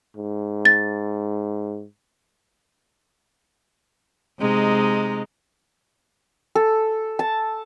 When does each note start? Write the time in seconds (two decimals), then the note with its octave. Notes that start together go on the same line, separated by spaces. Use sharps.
0.16 G#2
0.65 A6
4.39 C3 G#3 D#4
6.55 A4
7.19 A5